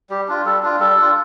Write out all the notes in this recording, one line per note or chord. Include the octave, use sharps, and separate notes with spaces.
G3 G4
D4 F4
G3 A4
D4 F4
G3 A4
D4 F4